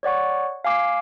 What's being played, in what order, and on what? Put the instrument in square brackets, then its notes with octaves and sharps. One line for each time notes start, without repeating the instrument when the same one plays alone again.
[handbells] C#5 D5 F#5 C#6
F5 G#5 D6 C7